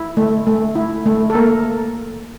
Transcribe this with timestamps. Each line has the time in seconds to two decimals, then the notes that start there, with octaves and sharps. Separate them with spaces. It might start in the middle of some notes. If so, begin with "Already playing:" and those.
Already playing: E4
0.17 A3
0.47 A3
0.75 E4
1.06 A3
1.30 A4
1.35 A#3 A#4